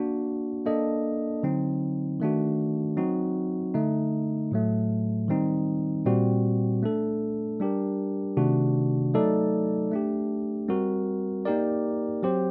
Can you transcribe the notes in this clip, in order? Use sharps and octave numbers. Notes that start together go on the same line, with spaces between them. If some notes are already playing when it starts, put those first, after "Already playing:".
Already playing: A#3 D4 F#4
A#3 D4 A4 D#5
D3 F#3 C4 D#4
D#3 A3 D4 F#4
F#3 C4 D#4 F#4
D3 A3 D#4
A2 F#3 A3
D#3 G3 C4 D#4
A#2 G3 C4 F#4
A3 D4 A4
G3 D4 G4 A#4
C3 D#3 A3 D4 F#4
F#3 A3 D#4 A4 D5
A3 D4 G4
G3 C4 F#4 A#4
A#3 D#4 G4 A#4 D5
F#3 C4 G4 C5